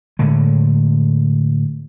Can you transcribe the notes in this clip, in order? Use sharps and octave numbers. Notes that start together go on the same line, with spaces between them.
A2 D3 G#3